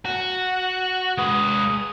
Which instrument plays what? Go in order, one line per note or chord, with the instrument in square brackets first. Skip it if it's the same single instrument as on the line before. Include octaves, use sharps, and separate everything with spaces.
[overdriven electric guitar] F#4
[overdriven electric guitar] G#3 B4 [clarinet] D#6